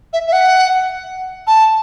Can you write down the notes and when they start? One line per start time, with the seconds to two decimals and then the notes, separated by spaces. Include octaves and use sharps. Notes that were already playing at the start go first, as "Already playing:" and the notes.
0.13 E5
0.27 E5
0.33 F#5
1.47 A5